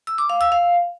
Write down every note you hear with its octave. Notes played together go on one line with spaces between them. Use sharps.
E6
D6
F5
E6
F5